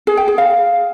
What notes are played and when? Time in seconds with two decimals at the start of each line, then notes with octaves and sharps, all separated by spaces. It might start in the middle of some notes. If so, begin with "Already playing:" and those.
0.07 G#4
0.17 G5
0.28 G#4
0.38 F5